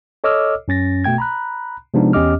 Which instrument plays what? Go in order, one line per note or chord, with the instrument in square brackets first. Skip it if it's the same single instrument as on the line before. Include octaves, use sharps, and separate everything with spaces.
[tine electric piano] A4 C#5 D#5 D6 E6 F6
F#2 C#4 A6 A#6
B2 A3 G5 G#6
A#5 B5 F#6
C3 F3 G#3 B3 D4 D#4
E2 C#4 G4 D#5 D6 F6